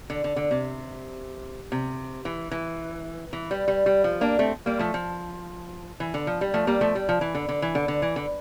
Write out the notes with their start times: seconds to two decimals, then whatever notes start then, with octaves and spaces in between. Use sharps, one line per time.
0.10 D3
0.24 D3
0.36 D3
0.51 C3
1.72 C3
2.25 E3
2.51 E3
3.33 E3
3.51 G3
3.68 G3
3.86 G3
4.04 F3
4.21 A#3 D4
4.39 A3 C4
4.66 G3 A#3
4.79 F3 A3
4.94 F3
6.00 E3
6.14 D3
6.27 F3
6.41 G3
6.54 F3 A3
6.67 G3 A#3
6.81 F3 A3
6.95 G3
7.09 F3
7.21 E3
7.35 D3
7.49 D3
7.62 E3
7.75 D3
7.88 D3
8.02 E3
8.16 D3